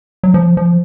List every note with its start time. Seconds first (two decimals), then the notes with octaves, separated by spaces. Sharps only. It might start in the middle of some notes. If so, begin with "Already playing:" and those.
0.23 F#3
0.34 F3
0.57 F3